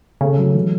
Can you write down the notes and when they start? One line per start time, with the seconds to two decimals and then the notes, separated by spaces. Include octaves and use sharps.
0.21 C#3 A3
0.38 F#3
0.54 E3 G#3